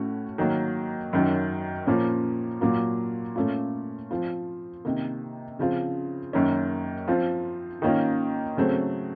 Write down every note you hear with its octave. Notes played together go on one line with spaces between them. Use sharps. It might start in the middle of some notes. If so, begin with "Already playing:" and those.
Already playing: A2 A3 C#4 F#4
D#3 F#3 A#3
F#2 D#3 F#3
A#2 F3 A#3 C#4
A#2 F#3 A#3 F4
A#2 A3 C#4 F4
F3 C4 F4
C3 D#3 A#3
C#3 F3 C4 F4
F#2 D#3 A#3 C#4
F3 C4 F4
D#3 A#3 C#4 F4
C#3 F#3 A3 C4